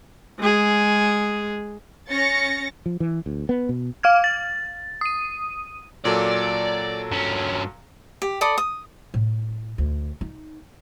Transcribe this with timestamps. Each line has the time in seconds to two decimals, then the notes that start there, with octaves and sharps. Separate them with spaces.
0.39 G#3 G#4
2.08 C#4 A6 A#6 C#7
2.86 F3
3.00 E3
3.26 D2
3.49 B3
3.69 B2
4.03 F5 F6 G#6
4.24 A6
5.01 D#6 D#7
6.05 A#2 F#3 A4 D5
7.12 G2 C#4
8.22 G4
8.41 A4 D5 B5 D#6
8.58 D#6
9.14 A2
9.78 D2
10.21 D#4